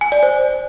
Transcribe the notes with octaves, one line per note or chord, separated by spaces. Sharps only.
G#5
D5
C5